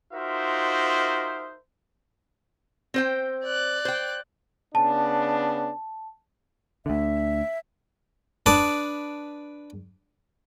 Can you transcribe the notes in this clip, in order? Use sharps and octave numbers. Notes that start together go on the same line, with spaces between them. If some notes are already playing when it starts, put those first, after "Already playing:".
D#4 F4 F#4 A#4 C5 E5
C4 C5 G5
D5 F#6
C5 G5
C#3 B3 D4 A5
D2 D3 E5
D4 B4 A5 D6 D#6